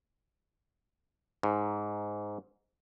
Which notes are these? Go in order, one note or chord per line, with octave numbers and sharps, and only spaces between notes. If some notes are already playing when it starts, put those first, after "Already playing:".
G#2